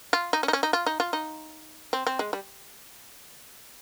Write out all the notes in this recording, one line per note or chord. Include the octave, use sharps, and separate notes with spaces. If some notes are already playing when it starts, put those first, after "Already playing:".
F4
D#4
C#4
D#4
C#4
D#4
F4
D#4
F4
D#4
C4
C4
G#3
G3